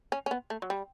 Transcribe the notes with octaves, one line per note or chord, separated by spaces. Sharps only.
C#4
C#4
B3
A3
F#3
G3